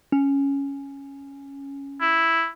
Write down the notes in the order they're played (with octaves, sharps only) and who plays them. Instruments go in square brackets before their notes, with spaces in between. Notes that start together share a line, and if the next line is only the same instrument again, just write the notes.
[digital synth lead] C#4
[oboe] E4